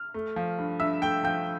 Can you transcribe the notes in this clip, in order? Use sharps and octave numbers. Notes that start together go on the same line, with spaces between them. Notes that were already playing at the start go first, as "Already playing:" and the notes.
Already playing: F6
A3
F3
G2
G2 E5 E6
A3 G5 G6
F3 G5 G6